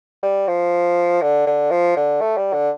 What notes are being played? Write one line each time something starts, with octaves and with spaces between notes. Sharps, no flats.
G3
F3
D3
D3
F3
D3
A3
G3
D3